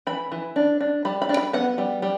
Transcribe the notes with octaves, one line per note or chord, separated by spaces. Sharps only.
E3 B5
E3
D4
D4
G3 B5
B5
D4
B5
B3 F#5
G3
G3